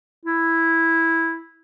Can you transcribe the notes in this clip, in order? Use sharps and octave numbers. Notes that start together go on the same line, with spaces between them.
E4